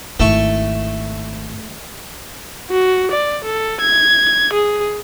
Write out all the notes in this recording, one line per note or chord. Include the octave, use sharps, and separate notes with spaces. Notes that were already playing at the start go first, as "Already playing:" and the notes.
G#1 A3 E4 C#6
F#4
D5
A4
G#6
G#4